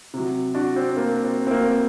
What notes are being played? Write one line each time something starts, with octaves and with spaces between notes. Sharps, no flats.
C3 F#3
D4 F#4
C4
A#3
C4
C4
A#3